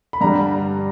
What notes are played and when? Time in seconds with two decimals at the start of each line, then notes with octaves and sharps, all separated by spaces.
0.13 B5
0.21 G2 D3 G3 A#5